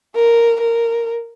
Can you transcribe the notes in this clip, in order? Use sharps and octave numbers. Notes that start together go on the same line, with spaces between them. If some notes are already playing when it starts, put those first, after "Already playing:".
A#4
A#4